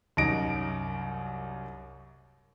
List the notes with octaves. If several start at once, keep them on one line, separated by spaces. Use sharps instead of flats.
C2 F#2 D#4 A#6 D7